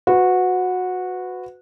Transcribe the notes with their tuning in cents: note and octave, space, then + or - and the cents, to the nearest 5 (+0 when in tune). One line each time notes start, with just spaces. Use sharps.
F#4 -15 B4 +25